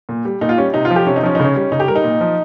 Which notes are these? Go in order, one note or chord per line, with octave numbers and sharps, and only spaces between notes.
A#2
G3
A#2 D#4
F4
G3 C#4
C3 D#4
F4
F3
G4
C3 C#4
D#4
F3 C#4
D#4
C#3 C#4
G3
C#3 D#4
G4
G3 A#4
D#4
A#2
F3